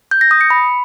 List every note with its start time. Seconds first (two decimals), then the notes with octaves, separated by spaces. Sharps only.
0.11 G6
0.21 A#6
0.31 D#6
0.41 C#7
0.50 B5